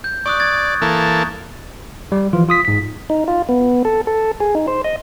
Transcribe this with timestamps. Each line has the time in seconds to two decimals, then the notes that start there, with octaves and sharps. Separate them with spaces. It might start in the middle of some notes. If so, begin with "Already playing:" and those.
0.04 G6
0.26 D5 C#6 D#6 F#6
0.40 G#6 A6
0.82 E3 A#3 A4
2.12 G3
2.33 E3 F3 F4
2.49 F4 D#6 B6
2.65 G#2 B6
3.10 D#4
3.28 F4
3.49 B3
3.85 A4
4.07 A4
4.40 G#4
4.55 D#4
4.68 C5
4.84 D#5